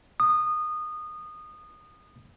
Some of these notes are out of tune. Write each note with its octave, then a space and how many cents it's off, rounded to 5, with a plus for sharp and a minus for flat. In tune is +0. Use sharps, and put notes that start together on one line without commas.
D#6 -20